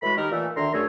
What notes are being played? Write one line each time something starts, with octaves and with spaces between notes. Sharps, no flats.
A2 E3 G#3 F#4 B5
D#3 G4 A#4
A#2 E3 A3
D2 D3 D#3 E5 A#5 C6
F#2 D3 A3 G#4 A4 C#5